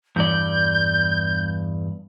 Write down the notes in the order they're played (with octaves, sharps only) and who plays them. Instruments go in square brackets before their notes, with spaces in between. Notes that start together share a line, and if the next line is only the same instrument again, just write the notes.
[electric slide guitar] E2 G2 D5 [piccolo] G6